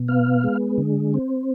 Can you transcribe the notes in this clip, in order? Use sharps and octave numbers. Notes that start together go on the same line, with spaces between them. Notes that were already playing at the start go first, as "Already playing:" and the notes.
Already playing: B2
B3 F5
G#3
D3
C4